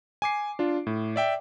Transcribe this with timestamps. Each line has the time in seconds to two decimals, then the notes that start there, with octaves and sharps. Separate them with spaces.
0.22 G#5 D6 C7
0.59 D4 F4
0.87 A2
1.16 D5 E5 G5